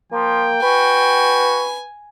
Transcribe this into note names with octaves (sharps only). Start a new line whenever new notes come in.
F3 A#3 G5
F#4 B4 G#5